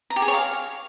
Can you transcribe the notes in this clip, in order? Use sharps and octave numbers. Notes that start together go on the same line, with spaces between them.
A#5
G4
G#4
C#5
F5